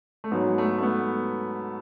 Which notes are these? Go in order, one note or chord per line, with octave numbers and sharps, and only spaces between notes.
A3
G#2 F#3 B3
A3
A3
B3